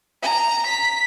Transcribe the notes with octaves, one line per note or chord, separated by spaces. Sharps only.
A#5
B6